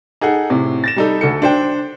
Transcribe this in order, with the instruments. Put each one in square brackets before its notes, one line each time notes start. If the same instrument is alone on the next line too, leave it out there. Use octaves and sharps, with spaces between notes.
[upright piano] D#4 G#4 A4 F#5
A2 C3
A6 A#6 E7
G3 D#4 A4
D2 A4 C#7
D4 C5 G5